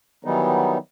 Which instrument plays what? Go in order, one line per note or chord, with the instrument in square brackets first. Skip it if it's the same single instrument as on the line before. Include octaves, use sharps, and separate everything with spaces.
[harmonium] D#3 E3 F#3 G3 B3 D#4